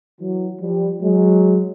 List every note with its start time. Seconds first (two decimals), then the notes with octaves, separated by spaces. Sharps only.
0.19 E3 F#3
0.60 F3 G3
1.01 F#3 G#3